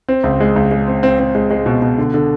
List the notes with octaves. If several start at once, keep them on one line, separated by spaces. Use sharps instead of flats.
C4
C#2
G#3
C#2
G#3
C4
C4
C4
G#3
G#3
B2
B2
D3
D3